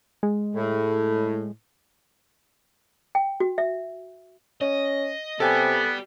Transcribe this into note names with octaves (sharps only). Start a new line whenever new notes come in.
G#3
A2
G5
F#4
E5
C#4 D#5
C3 B3 G4 A4 D5 G5 G#5